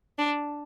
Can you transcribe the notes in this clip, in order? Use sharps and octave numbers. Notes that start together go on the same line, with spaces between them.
D4